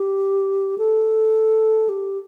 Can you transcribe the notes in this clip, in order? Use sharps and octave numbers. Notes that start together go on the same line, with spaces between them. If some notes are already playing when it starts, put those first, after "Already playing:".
Already playing: G4
A4
G4